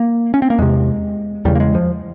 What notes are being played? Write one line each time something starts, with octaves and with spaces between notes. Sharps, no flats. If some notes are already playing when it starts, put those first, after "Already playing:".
Already playing: A#3
C#4
C4
A#3
E2 C3 G#3
E2 C#3 G3
A#3
G#3
F3